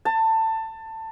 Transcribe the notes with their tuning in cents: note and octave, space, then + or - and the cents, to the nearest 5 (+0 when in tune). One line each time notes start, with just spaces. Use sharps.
A5 +20